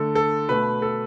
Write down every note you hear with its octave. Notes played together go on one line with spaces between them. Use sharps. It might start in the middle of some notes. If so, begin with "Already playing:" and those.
Already playing: D3 A3 A4
A4
B2 A3 B4
A4